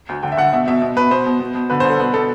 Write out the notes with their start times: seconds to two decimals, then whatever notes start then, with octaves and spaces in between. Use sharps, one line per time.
0.09 D2
0.23 D3 G5
0.32 E5
0.37 D3 F#5
0.53 B2 E5
0.67 B2 E5
0.82 B2
0.96 B2 B4
1.11 B2 C5
1.26 B2
1.40 B2
1.55 B2
1.70 D3 B4
1.80 D3 C5
1.90 A4
1.99 B2 B4
2.14 B2 A4